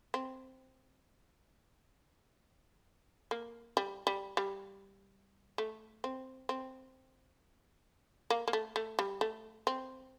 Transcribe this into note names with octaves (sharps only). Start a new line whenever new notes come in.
C4
A#3
G3
G3
G3
A3
C4
C4
A#3
A#3
A3
A3
G3
A3
C4